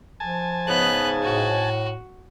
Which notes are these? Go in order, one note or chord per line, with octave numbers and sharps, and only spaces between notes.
F3 G#5 A5
G#2 C#3 B3 F#6
A2 F#4